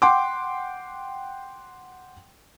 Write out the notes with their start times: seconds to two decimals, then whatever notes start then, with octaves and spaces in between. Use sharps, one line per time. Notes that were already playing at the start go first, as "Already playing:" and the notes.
0.02 F#5 G5 C6 D6